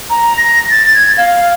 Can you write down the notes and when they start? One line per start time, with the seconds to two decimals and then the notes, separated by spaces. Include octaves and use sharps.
0.10 A#5
0.37 A#6
0.71 A6
0.94 G#6
1.18 F5